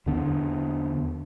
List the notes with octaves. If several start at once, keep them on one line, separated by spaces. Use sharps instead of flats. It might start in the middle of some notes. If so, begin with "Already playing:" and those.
E2 D3 B3 D4